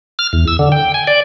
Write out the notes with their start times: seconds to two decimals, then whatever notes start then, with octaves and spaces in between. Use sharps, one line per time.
0.19 F6
0.33 E2
0.48 E6
0.59 D3
0.72 G5
0.94 G#5
1.07 D5